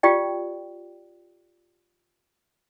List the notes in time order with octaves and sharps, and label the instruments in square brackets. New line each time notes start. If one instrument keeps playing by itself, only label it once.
[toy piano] F4 G4 D5 G5